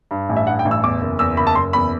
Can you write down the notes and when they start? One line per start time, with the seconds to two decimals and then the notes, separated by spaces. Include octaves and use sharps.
0.11 G2
0.29 A1
0.37 E5
0.47 G2 F#5
0.59 G5
0.65 A1
0.71 E6
0.83 E2 D6
1.01 F#1
1.19 E2 E6
1.37 F#1 B5
1.47 A5
1.55 F#1 C6
1.73 E2 B5